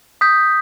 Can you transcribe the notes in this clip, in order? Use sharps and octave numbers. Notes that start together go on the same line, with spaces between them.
D#6 G6 B6